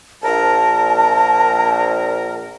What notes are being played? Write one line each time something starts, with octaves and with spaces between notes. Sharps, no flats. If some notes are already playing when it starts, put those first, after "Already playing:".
A#1 A#4 A5